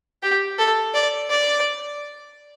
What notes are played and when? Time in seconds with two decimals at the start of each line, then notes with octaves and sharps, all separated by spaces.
0.23 G4
0.59 A4
0.94 D5
1.30 D5